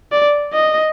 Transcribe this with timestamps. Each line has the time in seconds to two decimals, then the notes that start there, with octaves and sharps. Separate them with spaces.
0.12 D5
0.53 D#5